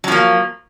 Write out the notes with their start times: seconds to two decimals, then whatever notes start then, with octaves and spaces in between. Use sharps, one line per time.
0.04 F#3
0.08 F3
0.12 A#3